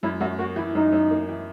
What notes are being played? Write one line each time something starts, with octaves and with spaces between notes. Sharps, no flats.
F#2 E4
F#2 F#4
A#3 F#4
E3 E4
F#2 D#4
F#2
A#3
E3